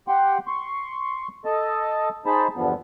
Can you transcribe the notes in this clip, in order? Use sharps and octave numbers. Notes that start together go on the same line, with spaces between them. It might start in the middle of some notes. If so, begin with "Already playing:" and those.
G4 F#5 G5 C6
C6 C#6
A4 D#5 A5
D#4 G#4 C5 A5 B5
E2 G2 D3 F3 B3